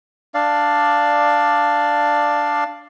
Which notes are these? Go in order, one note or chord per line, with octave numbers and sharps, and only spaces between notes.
D4 D5 F5